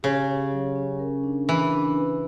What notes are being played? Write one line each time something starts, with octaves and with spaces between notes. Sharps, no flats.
C#3 G4
C#5
F#3
C#4
A#4
D4
E3 D4
D4
B4